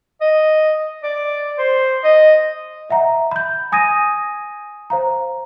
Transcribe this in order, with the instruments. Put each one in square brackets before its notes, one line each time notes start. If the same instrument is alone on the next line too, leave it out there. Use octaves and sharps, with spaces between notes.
[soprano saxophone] D#5
D5
C5
D#5
[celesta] D#5 E5 F#5 A#5
B5 G6
G#5 D#6 G#6 A#6 D#7
C5 F5 A#5